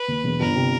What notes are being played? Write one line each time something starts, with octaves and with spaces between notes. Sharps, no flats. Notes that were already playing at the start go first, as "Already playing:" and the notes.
Already playing: B4
D#2
E1
G1 A#4
C3